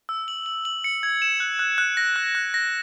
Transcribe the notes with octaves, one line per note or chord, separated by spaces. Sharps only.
E6
F#7
F#7
F#7
C#7
G#6
E7
F#6
F#6
F#6
A#6
F#6
F#6
A#6